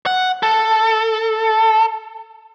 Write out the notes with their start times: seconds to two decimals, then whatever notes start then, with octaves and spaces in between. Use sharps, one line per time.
0.06 F#5
0.43 A4